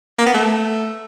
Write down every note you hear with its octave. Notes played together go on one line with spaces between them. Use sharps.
A#3
B3
A3